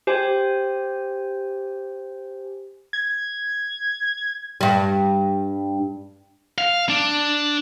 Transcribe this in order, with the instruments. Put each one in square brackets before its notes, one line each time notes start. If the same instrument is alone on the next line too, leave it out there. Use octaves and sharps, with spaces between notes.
[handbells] G4 C5 G#5
[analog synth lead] G#6
[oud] G2 G3
[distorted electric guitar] F5
D4